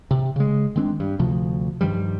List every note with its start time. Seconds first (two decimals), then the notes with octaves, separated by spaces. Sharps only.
0.11 C3
0.36 C#3 G#3
0.76 D#3 G#3 C4 D4
1.00 G2
1.19 D2 C3 F3
1.81 G2 D#3 F3 G3